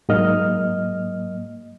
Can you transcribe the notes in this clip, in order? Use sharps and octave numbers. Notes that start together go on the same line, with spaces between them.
G#2 F#3 A#3 D#5 F6